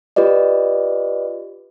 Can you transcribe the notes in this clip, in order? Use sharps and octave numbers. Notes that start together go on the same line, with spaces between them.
F4 G4 B4 D5 D#5